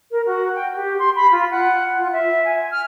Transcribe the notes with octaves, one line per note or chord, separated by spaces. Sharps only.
A#4
F#4
G5
G4
C6
B5
F4
F#5
F4
E5
G#5
F6